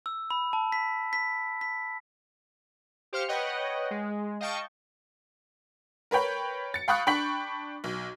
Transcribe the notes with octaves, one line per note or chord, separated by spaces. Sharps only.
E6
B5
A5
B6
B6
B6
G4 C5 F5 F6 C#7
B4 C#5 D#5 F#5 G5
G#3
D#5 F5 G5 A5 C#6
A#4 B4 C#5 G5 B5
A6 C#7
F5 G5 B5 C#6 D#6 F#6
D4 G5 B5 C#6 B6 F#7
B1